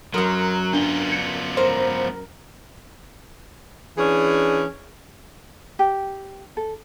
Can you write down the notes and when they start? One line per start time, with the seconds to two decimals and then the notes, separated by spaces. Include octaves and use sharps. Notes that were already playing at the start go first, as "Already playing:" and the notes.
0.14 F#2 F#3 A#4 C6 D#6 F6
0.73 B3 D4 F4 G7
1.10 G6 G#6 C#7
1.57 A#4 C5
3.98 E3 C#4 D4 G#4
5.79 G4
6.57 A4